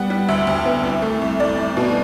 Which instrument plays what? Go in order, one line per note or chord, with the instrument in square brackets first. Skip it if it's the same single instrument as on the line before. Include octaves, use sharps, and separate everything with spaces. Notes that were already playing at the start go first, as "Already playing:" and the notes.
Already playing: [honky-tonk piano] G3 B3 F#5
G3
D2 E5
D2
B3
C2
A3
C2
C2 D5
C2
B2